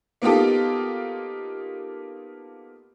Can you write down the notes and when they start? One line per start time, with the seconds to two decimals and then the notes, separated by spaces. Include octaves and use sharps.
0.22 A#3 B3 D#4 F4 G4 A4